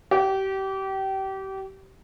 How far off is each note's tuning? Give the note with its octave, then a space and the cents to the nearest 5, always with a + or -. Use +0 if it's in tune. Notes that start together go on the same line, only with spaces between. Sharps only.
G4 -30